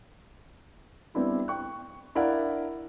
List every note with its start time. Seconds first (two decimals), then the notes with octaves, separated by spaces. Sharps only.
1.14 G3 B3 C4 D4 E4 G4
1.48 G5 C#6 F#6
2.15 D4 E4 A#4 D5 F5 F#5